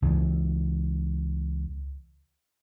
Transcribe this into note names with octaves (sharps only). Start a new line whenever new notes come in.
C#2 E3